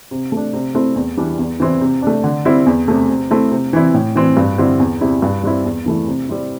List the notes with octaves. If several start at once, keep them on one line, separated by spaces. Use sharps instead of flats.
C3
A3 D4
C3
A3 C4 E4
E2
E3 G3 D4
E2
E3 C4 E4
C3
A3 D4
D3
G3 C4 E4
E2
C3 A3
C3
A3 C4 E4
C3
E3 C4 E4
A2
E3 C4 E4
G2
D3 G3 C4 E4
E2
C3 G3 C4 E4
G2
G3 C4 E4
E2
E3 A3 E4
C3
G3 C4 E4